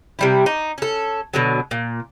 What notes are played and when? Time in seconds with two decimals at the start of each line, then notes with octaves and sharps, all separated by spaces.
0.19 C3 G3 E4
0.46 D#4
0.78 C#4 A4
1.34 B2 D3 F#3
1.71 A#2